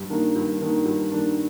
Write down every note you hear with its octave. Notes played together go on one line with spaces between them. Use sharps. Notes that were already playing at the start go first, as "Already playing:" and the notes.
Already playing: G2
D#3 A#3 D4
G2
D#3 A#3 D4
G2
D#3 A#3 D4